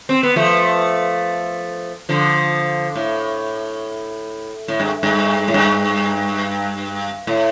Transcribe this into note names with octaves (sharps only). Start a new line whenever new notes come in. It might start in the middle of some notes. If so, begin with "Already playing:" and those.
C4
B3
F3 A3
D3 F3
A2
A2
G2
G2
A2
G2
A2